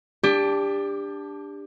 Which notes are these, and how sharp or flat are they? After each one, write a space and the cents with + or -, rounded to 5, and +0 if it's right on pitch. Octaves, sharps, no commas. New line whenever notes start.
D4 -5 G4 +25